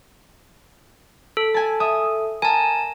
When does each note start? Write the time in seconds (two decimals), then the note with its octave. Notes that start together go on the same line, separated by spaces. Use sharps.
1.37 A4
1.54 G#5 A5
1.80 E5 D#6
2.42 A#4 G#5 A5